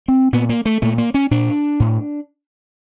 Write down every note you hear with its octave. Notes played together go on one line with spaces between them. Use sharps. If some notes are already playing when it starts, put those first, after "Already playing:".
C4
A#2 B3
A#3
A3
A#2 A3
A#3
C#4
A#2 D4
A2